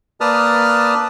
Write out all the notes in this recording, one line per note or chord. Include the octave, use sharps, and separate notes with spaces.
A#3 B4 D5 A5 D#6 F6